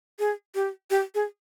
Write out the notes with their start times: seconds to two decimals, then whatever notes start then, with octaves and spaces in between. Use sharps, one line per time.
0.19 G#4
0.55 G4
0.90 G4
1.15 G#4